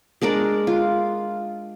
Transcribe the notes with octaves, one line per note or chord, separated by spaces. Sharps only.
G#3 D4 A#4 D5
F4